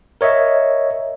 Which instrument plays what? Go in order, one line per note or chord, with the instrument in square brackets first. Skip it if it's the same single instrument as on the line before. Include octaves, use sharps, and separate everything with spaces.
[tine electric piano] A#4 C#5 D#5 E5